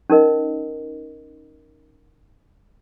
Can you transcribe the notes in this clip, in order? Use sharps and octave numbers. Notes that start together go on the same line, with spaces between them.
C#4 D#4 A#4 D#5